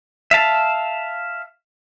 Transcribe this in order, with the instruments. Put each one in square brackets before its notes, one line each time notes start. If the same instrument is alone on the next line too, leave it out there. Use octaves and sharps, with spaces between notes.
[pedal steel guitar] E5 F5 A5